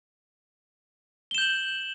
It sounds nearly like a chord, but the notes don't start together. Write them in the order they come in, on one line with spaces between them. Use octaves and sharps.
G7 E7 G6 F#7